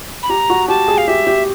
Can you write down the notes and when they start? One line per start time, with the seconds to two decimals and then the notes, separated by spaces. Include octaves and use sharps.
0.23 B5
0.30 G4 A#5
0.50 F#4
0.68 G4 A5
0.88 G#4
0.98 F5
1.08 G4 E5
1.27 G4